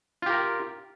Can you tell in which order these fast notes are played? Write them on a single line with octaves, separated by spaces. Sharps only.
F4 G4 A#4